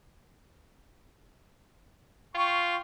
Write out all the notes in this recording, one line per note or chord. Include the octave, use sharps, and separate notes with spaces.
F4 G5 C#6